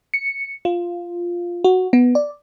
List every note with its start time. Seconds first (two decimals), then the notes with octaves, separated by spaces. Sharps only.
0.14 C#7
0.65 F4
1.64 F#4
1.93 B3
2.15 D5